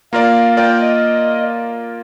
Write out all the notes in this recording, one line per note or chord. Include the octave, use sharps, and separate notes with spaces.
A#3 F4 A#4 D5 F5
A#3 F4 A#4 D5 G5
D#5